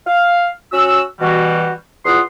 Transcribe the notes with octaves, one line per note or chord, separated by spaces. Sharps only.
F5
C#4 F#4 E6
B2 E3 G3 F#4
E2 F4 F#5 C6 D#6